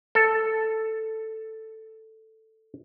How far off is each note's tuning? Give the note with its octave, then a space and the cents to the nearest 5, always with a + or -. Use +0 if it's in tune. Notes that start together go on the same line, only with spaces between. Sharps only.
A4 +5